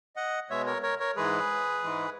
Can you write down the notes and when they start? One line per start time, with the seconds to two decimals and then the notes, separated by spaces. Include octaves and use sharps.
0.16 D#5 F#5
0.50 B2 G#3 C#5 E5
0.66 A#4 C#5
0.83 A#4 C#5
1.00 A#4 C#5
1.16 G#2 E3 G#3 G#4 B4
1.83 G#2 E3 G#3